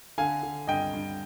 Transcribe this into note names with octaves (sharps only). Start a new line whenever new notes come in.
D3 F5 G#5
D3
G2 D#5 G5
G2